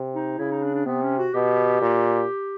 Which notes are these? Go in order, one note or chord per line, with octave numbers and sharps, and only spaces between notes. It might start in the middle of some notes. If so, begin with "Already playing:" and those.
Already playing: C3
D#4
C#3 E4
D#4
D4
D4
C3 B3
C#4
F#4
B2 G4
A#2